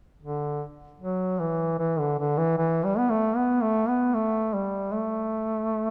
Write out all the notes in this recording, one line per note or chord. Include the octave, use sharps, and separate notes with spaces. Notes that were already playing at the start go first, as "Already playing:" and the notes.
D3
F#3
E3
E3
D3
D3
E3
E3
G3
B3
A3
B3
A3
B3
A3
G3
A3